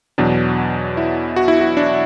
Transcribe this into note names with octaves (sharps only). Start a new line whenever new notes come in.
E2 B2 F#3 D4
E4
F#4
E4
F#4
D4